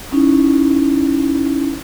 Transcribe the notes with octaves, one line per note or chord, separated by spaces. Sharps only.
C#4 D#4 E4